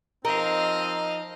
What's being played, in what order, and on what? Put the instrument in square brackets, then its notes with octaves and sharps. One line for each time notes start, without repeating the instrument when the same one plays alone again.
[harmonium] F3 D#4 [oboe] C4 [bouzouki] A#4 [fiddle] D#5 F5